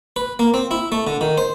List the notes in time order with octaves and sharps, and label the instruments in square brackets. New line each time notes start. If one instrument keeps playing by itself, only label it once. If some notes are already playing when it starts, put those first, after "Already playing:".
[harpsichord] B4
A#3
C4
E4
A3
D3
D#3
C5